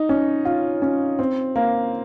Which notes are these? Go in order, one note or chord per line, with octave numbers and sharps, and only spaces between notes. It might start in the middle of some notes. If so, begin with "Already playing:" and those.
Already playing: D#4
C#4
F4
C#4
C4
A#3